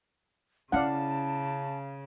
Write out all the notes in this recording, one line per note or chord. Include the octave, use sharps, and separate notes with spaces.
C#3 C#4 E4 D5 F5 F#5 A5